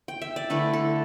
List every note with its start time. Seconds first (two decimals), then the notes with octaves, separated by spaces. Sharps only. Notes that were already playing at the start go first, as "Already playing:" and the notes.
0.08 G5
0.22 E5
0.36 D5
0.50 D3 A3 E4 B4
0.73 A4